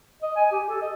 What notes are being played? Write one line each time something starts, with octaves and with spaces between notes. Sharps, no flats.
D#5
G#5
G4
A4
D#5